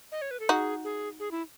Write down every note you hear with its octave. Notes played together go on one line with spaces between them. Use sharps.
D#5
C#5
B4
A4
D#4 F#4 G#4
G#4
G#4
E4